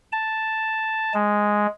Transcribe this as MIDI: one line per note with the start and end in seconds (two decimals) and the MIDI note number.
0.12 1.13 81
1.14 1.67 56